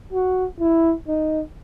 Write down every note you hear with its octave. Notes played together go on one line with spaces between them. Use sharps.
F#4
E4
D#4